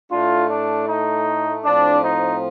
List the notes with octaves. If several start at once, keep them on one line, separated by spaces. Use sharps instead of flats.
A2 A3 D4 F4
D4
D#4
A2 F3 C4 D4
D#4